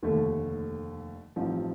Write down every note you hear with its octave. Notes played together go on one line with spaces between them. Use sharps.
F1 D#2 D3 A3
A1 G2 F3 C4 D#4